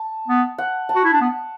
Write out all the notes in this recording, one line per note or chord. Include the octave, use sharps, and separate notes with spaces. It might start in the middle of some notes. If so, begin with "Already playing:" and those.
Already playing: A5
B3
F#5
A5
F#4
E4
D4
B3